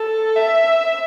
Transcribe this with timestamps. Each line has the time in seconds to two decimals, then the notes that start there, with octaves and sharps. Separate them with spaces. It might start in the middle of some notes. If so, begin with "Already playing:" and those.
Already playing: A4
0.36 E5